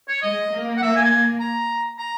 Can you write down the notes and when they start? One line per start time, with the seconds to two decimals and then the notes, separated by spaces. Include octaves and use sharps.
0.09 C#5
0.22 G#3 D#5
0.52 A#3
0.77 F#5
0.81 A#3 E5
0.96 G#5
1.40 A#5
1.99 A#5